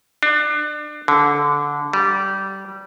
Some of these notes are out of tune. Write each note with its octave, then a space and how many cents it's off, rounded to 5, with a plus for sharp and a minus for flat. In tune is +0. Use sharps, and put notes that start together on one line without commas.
D4 +30
D3 -15
G3 -20